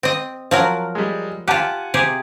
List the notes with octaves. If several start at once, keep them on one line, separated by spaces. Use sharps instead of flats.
C4 D#5
F3 F#3 A#4
G3 G#3
F4 G4 F#5 G#5 A5
C3 G4 G#4